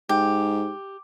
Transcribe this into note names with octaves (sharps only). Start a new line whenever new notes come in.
G#2 G4